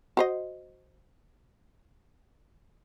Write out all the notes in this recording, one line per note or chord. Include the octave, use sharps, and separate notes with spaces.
F#4 C5 D#5